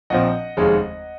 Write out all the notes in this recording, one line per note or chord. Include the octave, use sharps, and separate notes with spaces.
A#1 A#2 F3 C4 D#5 F#5
F1 D#2 C#3 G#3